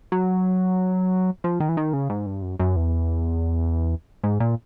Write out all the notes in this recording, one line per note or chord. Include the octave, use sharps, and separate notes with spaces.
F#3
F3
D#3
E3
D#3
C#3
G#2
G2
F#2
F#2
E2
G#2
A#2